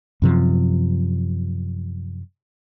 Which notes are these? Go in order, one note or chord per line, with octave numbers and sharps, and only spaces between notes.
F#2 C3 F3